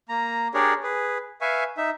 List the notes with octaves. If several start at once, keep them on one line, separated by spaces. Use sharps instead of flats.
A#3 A#5
D4 G4 G#4 A#4 C#5 D5
G#4 B4
B4 E5 F5 G#5 C#6
D#4 E5